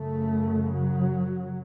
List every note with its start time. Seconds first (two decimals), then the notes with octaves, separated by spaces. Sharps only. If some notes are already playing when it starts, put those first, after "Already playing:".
Already playing: F#2 C#3 A3
0.73 F#3